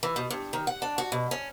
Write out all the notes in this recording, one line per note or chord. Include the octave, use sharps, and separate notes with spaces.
E3
B2
G2
D#3
F#5
D4
F#4
B2
C#4